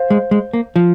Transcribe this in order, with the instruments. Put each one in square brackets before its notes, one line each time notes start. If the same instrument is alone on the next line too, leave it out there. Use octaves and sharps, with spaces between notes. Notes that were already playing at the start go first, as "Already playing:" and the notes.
Already playing: [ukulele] C5 F5
[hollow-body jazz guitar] G#3
G#3
A#3
F3